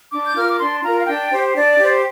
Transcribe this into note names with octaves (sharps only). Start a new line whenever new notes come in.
D4 D6
G6
F4 A#4 F6
D6
D4 C6
F4 A#4 A#5
F5
D4 G5
G4 C5
D4 D5
G4 C5